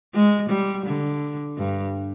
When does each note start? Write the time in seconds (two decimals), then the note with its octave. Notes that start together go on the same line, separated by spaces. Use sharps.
0.14 G#3
0.50 G3
0.86 D3
1.58 G2